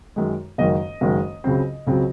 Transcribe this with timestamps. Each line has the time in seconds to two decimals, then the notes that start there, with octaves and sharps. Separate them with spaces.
0.16 F#2 D#3 G#3
0.58 F#1 F#2 D#3 G#3 D#5
1.01 F#1 F#2 D#3 G#3
1.44 C#2 C#3 F#3 C4
1.87 C#2 C#3 F#3 C4